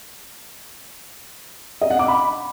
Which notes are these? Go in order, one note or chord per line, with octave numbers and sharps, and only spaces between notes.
D#5
F#5
D6
B5